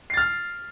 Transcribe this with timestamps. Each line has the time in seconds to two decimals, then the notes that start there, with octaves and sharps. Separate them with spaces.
0.10 C7
0.14 A6
0.17 F6